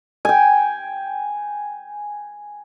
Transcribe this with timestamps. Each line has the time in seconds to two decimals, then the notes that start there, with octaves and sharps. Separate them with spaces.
0.25 G5 G#5